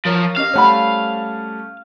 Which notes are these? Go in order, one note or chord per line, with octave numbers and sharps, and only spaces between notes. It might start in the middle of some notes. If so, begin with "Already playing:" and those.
F3 A#4 C#5
C#4 G4 D#5 F5
G3 A3 C#4 C5 F#5 B5